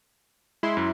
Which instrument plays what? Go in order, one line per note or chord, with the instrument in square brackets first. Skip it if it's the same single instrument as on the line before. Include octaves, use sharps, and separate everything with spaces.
[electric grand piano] G#3 [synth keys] E4 C6
[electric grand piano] F#2